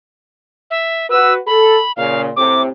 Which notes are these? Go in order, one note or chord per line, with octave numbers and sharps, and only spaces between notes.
E5
F#4 B4 E6
A4 B5
A#2 C#3 F5
A2 C3 D6